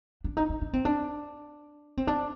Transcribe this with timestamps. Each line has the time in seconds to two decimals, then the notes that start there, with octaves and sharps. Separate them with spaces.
0.24 D4
0.37 D#4
0.49 D#4
0.61 D4
0.73 C4
0.85 D4
1.97 C4
2.07 D4